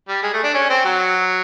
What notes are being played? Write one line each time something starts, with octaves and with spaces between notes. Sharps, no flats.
G3
G#3
A3
D4
C#4
C4
F#3